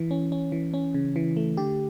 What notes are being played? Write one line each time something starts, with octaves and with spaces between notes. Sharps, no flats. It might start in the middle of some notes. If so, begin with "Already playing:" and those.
Already playing: E3
C#4
C#4
E3
C#4
C#3
E3
A3
D3 G4